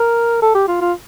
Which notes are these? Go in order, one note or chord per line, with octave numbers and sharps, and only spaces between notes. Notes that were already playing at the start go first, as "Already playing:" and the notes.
Already playing: A#4
A4
G4
F4
F4